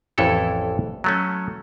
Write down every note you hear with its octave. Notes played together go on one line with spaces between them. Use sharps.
A1 F2 E3 E4 A4 C#5
F#3 A3 C#4